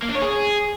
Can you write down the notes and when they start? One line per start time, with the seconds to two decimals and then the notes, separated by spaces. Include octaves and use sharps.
0.02 A#3
0.09 D4
0.15 C#5
0.22 G#4